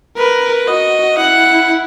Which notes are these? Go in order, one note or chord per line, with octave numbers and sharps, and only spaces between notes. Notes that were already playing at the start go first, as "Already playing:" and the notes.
A#4 B4
F#4 D#5
E4 F#5